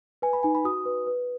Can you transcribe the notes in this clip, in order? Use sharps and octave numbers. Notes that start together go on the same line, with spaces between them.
B4 G#5
B5
D#4 G#5
B5
F#4 D#6
B4
B4